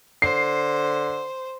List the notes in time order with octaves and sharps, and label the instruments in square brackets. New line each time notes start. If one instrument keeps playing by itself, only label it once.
[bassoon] D3 [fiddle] C5 [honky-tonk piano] C7